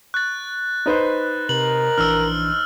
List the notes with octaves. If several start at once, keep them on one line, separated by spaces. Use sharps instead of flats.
C#6 F#6 A6
D#4 B4 C5
C3 A#4 F#7
A#1 E3 D4 E6 F6